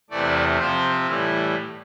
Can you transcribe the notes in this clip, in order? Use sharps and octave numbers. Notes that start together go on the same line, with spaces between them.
E2 C3 E3 A3 D5
C3 F3 C4 C5
A2 E3 G3 E4